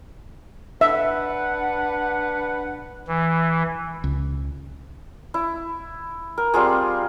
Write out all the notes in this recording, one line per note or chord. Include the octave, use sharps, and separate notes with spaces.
D4 B4 E5 F#5
E3
C#2
E4
A#4
G3 C4 F4 G#4